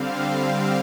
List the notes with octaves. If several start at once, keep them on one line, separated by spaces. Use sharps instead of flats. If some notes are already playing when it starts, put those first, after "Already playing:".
Already playing: D3 G3 C4 F5
F5